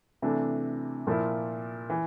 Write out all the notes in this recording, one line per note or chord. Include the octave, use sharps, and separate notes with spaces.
C3 E3 A3 D4
A#2 F3 A#3 E4
E3